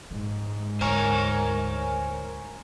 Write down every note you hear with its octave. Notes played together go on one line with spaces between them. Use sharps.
G#2 G#3
D2 A#4 C5 C#5 G#5